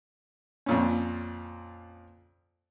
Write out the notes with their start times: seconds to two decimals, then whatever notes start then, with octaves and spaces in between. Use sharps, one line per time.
0.66 F2 A#2 C#4